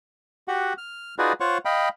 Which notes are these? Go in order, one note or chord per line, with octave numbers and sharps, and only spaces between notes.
F#4 G4 F#5
F6
D#4 F4 F#4 G#4 B4 D5
F4 C5 C#5 F#5 C#6
D#5 F5 G5 B5